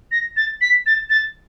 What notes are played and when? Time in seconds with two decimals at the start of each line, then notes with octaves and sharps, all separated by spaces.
0.12 A#6
0.37 A6
0.61 B6
0.86 A6
1.10 A6